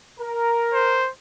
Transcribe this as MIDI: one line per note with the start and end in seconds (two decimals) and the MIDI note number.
0.20 1.04 70
0.74 1.10 72